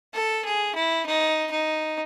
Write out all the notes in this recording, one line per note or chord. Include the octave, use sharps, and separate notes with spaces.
A4
G#4
E4
D#4
D#4